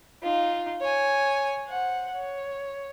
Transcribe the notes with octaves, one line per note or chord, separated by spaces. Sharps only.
D#4 F4
C#5 G#5
C5 F#5
C#5